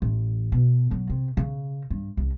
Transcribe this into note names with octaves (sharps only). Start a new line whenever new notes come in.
A1
B2
F#3
C3
C#3
G2
C2